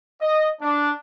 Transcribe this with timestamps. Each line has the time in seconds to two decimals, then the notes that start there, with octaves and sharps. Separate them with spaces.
0.21 D#5
0.60 D4